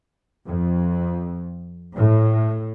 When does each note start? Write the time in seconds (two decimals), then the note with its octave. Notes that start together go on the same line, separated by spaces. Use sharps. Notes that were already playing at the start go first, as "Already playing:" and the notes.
0.45 F2
1.95 A2